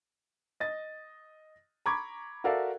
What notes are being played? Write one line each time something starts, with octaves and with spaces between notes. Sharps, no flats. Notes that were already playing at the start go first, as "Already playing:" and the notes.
D#5 A6
A#5 B5 C#6 D6 G#6
F#4 A4 A#4 D5 E5 F5